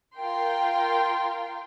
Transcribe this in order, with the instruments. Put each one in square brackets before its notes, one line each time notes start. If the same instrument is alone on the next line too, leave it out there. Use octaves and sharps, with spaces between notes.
[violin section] F4 A#4 G5 C6